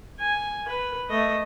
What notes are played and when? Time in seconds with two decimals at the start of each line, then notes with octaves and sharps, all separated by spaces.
0.20 G#5
0.68 B4
1.10 A3 D#5